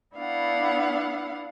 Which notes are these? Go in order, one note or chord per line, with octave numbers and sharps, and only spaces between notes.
B3 D4 E4 F5 F#5